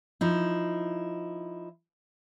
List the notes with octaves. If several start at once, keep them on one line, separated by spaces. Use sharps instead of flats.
F3 D#4 E4